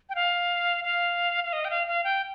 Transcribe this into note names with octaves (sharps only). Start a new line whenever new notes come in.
G5
F5
F5
F5
D#5
G5
F5
F5
G5